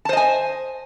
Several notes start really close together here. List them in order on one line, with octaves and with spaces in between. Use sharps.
A5 C5 D#5 G#5